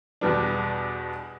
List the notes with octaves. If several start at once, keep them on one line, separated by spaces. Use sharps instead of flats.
E2 B2 G3 B3 D4